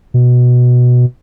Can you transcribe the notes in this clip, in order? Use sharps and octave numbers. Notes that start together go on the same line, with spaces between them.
B2